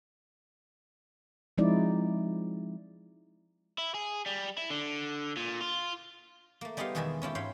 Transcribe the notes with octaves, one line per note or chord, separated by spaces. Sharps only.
F3 G#3 C4 D#4 E4 D5
E4
G#4
G3
E4
D3
A#2
F4
A3 A#3
G3 G#3 B3 D#4 G4 F5
E2 B2 D#3 G#3 A4 E5
C#4 E4 F4 G4
G#2 C#5 F5 G5 B5